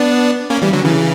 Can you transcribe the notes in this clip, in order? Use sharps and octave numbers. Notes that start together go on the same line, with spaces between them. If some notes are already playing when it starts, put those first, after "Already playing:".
Already playing: B3 D4
A#3 C#4
E3 G3
D3 F#3
C#3 E3